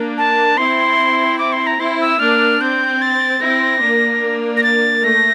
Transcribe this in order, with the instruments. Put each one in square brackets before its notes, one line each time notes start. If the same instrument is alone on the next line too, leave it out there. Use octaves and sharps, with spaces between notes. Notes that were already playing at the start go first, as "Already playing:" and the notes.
Already playing: [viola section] A#3 D4
[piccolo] A5
[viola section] C4 E4 [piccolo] C6
[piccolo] D6
C6
A#5
[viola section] C4 E4 [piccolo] C6
[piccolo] E6
[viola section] A#3 D4 [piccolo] F6
[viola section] C4 [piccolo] G6
[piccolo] A6
[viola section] C4 E4 [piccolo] A#6
[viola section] A#3 D4
[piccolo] A#6
A6
[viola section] A3 [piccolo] A#6